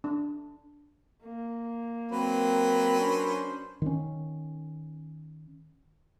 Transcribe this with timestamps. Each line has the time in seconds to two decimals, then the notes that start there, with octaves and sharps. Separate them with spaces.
0.04 D4
1.24 A#3
2.12 F#3 C4 A#4 B4
3.00 C#4 D4 C5
3.82 D#3 C#4